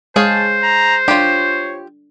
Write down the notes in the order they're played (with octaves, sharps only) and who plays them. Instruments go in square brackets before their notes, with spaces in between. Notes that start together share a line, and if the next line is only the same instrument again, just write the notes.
[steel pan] G#3 [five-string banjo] G#4 C#5 F5 [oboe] C5 [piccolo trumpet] A5
[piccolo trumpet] A#5
[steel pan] D4 [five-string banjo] F4 G4 [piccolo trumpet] C#5